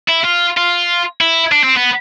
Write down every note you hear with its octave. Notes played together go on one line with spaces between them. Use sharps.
E4
F4
F4
E4
D4
C4
B3